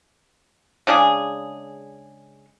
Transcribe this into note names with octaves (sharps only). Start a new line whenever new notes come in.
C#3 G#3 D4 G#4